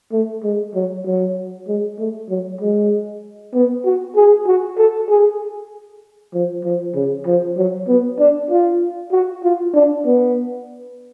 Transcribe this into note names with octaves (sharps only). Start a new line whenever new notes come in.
A3
G#3
F#3
F#3
G#3
A3
F#3
G#3
B3
F#4
G#4
F#4
A4
G#4
F3
F3
C#3
F3
F#3
B3
D4
F4
F#4
F4
D4
B3